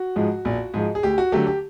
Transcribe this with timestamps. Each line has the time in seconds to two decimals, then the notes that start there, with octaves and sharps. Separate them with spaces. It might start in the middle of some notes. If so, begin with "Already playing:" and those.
Already playing: F#4
0.16 G#2 F3 G#3
0.45 A#1
0.74 G#2 F3 G#3
0.95 G#4
1.03 D2 G4
1.18 F#4
1.32 D3 F#3 A3 G4
1.47 G4